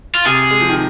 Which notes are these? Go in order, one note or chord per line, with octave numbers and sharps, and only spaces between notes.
F4
C3 G#4
G#3
F3
D#3